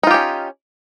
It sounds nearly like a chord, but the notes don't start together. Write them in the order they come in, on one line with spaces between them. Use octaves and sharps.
D#4 F4 G4 C#4